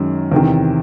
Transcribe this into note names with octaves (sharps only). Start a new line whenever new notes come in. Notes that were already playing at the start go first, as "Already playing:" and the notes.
Already playing: F#2 D#3 G#3 C#4
E2 C3 D#3